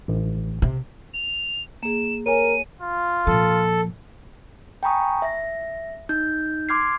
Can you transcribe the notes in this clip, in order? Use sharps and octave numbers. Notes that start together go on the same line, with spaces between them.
A1
C3
F7
A#3 G#4 E7
A#4 C#5 G#5 D#7
F4
A#2 F3 A4
G5 G#5 A#5 B5 C#6 D#6
E5 A#6
D#4 G6
C6 D6 F6 G#6 C7